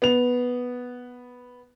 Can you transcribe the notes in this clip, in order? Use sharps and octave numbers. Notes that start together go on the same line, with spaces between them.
B3 F7